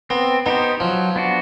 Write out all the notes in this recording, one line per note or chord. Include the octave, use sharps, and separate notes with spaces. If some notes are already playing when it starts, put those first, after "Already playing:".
B3 C4
B3 D#4 G4 C5
F3 F#3
B3 D4 F#4